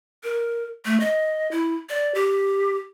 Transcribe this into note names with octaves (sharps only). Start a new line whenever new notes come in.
A#4
A3
D#5
E4
D5
G4